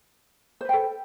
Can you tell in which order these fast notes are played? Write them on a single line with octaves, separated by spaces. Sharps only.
C5 B4 G5 A4